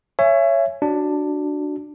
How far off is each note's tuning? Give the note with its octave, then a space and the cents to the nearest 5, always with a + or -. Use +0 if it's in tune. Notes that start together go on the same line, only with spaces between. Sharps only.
C#5 +0 E5 +30 G#5 +0
D4 +5 F#4 +0